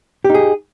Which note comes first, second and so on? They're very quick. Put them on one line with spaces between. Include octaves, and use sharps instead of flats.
G4 D#4 G#4